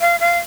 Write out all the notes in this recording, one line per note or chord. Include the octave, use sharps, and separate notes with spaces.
F5
F5